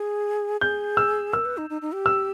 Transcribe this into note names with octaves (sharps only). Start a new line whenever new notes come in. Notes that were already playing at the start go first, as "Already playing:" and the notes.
Already playing: G#4
G#4 G6
E6
A#4 E6
B4
D#4
D#4
D#4
G4
E6